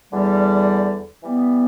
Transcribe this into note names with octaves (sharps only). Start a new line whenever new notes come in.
E2 D3 G3
E3 G3 B3